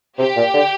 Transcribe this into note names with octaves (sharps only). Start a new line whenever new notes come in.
C3 G4
A#2
D3